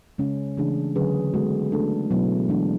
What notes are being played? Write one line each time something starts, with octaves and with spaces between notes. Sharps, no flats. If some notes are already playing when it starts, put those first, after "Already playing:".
C#3 G#3 C#4
C#3 E3 A3 D4 G#4
D3 F#3 C#4 G#4 B4
G#3 B3 F#4 A4
A3 D4 A4
B2 F#3 B3 E4
E3 G#3 D4